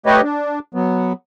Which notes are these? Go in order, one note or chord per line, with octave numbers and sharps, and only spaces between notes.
A3 G4 B4 C#5 D#5
D4
F#3 B3